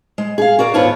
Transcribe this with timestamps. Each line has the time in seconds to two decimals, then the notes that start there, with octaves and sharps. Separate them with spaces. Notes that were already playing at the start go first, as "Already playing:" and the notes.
0.18 G#3
0.38 G#4 F5
0.59 F#4 A#4 D5
0.74 D#2 G#2 B3 F4 C#5 A5